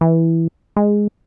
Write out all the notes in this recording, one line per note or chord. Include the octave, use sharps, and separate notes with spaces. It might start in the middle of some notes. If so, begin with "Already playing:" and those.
E3
G#3